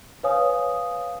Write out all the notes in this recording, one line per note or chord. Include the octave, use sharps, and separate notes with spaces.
B4 C#5 F5 G#5 D#6